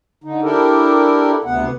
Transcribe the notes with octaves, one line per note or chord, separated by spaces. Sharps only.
D3 D#4
D4 E4 G4 A4 A#4
D2 C3 B3 F#5